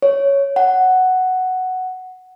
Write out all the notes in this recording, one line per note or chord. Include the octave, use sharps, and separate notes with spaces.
C#5
F#5